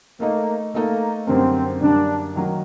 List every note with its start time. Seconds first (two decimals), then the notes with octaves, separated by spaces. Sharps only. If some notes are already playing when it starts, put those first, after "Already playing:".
0.20 A3 A#3 D#4 A4 D#5
0.74 A3 A#3 D#4 A4 D#5
1.27 F#2 D3 G3 A#3 C4
1.81 F#2 D3 G3 A#3 D4
2.35 D#3 F#3 A#3 D#4